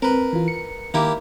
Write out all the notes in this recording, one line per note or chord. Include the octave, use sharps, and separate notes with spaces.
C4 A#4 B4
E3 F4
C#7
D#3 A#3 E4 G4